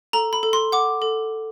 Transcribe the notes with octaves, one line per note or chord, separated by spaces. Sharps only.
A4 A#5
B5
A4
C6
F#5 D6
A4